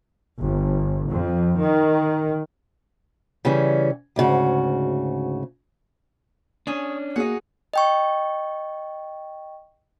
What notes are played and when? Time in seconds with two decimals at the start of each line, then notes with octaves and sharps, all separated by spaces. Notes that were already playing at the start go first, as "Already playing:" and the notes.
0.41 G1
1.11 F2
1.60 D#3
3.45 C#3 E3 G3 C#4
4.16 D2 G#2 C#3 F#4
6.67 C#4 D4 G#4 C#5
7.16 A#3 D#4 F#4 G#4 F#5
7.74 D#5 G5 C#6